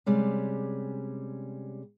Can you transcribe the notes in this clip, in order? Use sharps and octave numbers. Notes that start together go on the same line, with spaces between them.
C3 G3 G#3 C#4